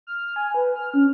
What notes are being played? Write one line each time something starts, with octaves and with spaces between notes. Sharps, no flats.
F6
G#5
B4
F6
C#4